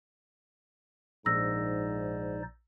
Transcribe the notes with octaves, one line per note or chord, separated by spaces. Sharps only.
A#1 G#2 D#4 C5 D5 E6 A#6